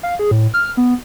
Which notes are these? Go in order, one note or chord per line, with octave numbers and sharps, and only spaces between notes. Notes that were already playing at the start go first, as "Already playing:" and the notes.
F5
G#4
A2
F6
B3